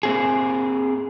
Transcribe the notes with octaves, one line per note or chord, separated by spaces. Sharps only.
A#3 C4 G#4